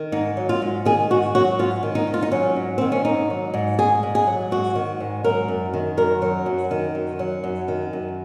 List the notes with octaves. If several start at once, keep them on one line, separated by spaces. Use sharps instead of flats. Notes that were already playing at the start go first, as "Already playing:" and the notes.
Already playing: D#3
G#2 D#4
F#3
F4
G#2
D#3 G#4
G#2 F#4
F#3 F#4
G#2 F4
D#3
D#4
G#2
F4
D#4
F#3 C#4
G#2
D#3 C4
C#4
G#2 D#4
F#3
G#2
D#3 G#4
G#2
G#4
F#3
G#2 F#4
D#3
G#2
F#3 A#4
F#2
D#3
F#2 A#4
F#3
F#2
D#3
F#2
F#3
F#2
D#3
F#2